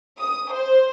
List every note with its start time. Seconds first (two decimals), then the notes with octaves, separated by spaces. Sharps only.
0.19 D#6
0.53 C5